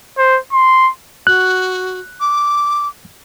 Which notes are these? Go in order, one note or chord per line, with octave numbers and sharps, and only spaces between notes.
C5
C6
F#4 F#6
D6